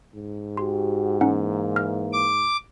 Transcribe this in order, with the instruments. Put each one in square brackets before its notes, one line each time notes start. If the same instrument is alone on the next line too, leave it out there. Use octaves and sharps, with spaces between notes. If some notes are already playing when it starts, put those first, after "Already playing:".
[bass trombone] G#2
[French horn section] F#4 G4 [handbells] C6
[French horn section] E3 A#3 [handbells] C#4 D#4 F#5
[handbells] F6
[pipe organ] D6